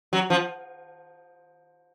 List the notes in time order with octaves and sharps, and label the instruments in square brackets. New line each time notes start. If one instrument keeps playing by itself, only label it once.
[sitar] F#3
F3